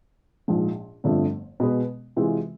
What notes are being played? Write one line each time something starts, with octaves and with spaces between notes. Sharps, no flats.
A#1 G#2 F3
G1 F2 D3 F3 A3
B2 G#3 B3
C3 E3 G#3 C4 F4